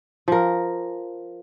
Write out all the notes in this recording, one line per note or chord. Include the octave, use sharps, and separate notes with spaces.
F3 A#4